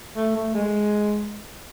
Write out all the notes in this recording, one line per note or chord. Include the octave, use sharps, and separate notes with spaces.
A3
A3
G#3